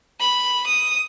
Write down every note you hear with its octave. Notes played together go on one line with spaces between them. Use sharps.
B5
D#6